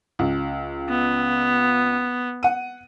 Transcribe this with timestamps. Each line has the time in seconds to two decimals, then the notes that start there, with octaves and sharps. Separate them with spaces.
0.19 C#2
0.89 B3
2.43 F#5 D#7